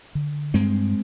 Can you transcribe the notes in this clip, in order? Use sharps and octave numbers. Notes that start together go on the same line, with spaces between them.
D3
G2 G#3 C4